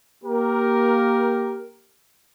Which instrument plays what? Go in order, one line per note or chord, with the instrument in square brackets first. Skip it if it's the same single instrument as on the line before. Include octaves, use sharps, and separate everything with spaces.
[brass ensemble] A#3 G4 A#4